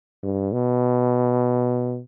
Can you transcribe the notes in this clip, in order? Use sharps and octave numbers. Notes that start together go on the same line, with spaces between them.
G2
B2